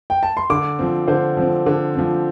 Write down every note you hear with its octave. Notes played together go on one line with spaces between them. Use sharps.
G5
A5
C6
D3 D6
F3 C4
D3 C5
F3 C4
D3
F3 C4